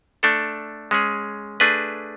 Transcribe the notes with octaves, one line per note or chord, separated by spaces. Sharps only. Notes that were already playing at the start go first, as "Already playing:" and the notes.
A3 D4 A4
G#3 C#4 G#4
A3 D4 G#4 B4